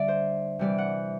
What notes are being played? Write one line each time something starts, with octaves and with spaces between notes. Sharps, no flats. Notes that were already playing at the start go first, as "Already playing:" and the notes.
Already playing: D3 G3 D5 E5
C5
C3 E3 G3 D5
F#5